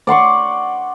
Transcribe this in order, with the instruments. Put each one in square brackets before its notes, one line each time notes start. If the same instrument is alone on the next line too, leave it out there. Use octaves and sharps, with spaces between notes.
[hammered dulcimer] D5 F#5 C6 C#6